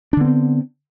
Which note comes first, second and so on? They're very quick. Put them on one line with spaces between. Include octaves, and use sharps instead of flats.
D4 D3 B3 C4